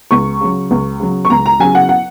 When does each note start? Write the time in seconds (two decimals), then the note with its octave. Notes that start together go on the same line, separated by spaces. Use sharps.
0.11 C#2 C#6
0.41 C#3 F#3
0.71 C#2
1.00 C#3 F#3
1.25 C#6
1.30 C#2 A#5
1.46 A#5
1.60 C#3 F#3 G#5
1.75 F#5
1.89 F#5